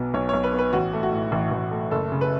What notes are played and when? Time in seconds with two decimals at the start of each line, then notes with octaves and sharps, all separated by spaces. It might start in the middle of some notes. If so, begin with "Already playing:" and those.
Already playing: B1 B2 B3
0.14 B1 C#5
0.29 C#5
0.34 B1
0.44 B4
0.53 B3
0.59 B4
0.73 A1 F#4
0.93 A3
1.03 F#4
1.13 A2
1.32 A1
1.51 A1
1.71 A3
1.91 F#1 A4
2.12 C#3
2.21 B4